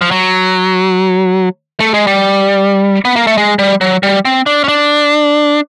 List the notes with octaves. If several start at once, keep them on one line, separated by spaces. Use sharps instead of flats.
F3
F#3
A3
G#3
G3
B3
A#3
A3
G#3
G3
F#3
G3
C4
D4
C#4
D4